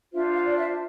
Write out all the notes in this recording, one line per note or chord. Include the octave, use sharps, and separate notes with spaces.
D4 F4 C5 E5
F5
D5
E5